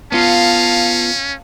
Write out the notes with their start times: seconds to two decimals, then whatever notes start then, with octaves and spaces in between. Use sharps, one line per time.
0.12 B3 C#4 F4 F5 A5